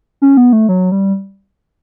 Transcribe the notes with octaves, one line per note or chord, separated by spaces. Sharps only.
C#4
B3
A3
F#3
G3